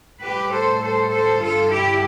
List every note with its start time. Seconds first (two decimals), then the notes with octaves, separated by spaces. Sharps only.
0.23 A2 G3 G4 B4
0.52 A4 C5
0.82 A4 C5
1.12 A4 C5
1.41 G2 D3 G3 F4 A4
1.71 E4 G4